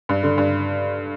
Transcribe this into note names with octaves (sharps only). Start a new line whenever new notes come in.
G2
D3
G2